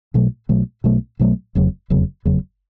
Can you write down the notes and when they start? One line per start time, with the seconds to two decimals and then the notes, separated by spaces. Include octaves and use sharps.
0.14 B1 B2 F#3 A3
0.49 B1 B2 F#3 A3
0.84 B1 B2 F#3 A3
1.19 B1 B2 F#3 A3
1.55 F1 E2 C#3 F#3
1.90 F1 E2 C#3 F#3
2.25 F1 E2 C#3 F#3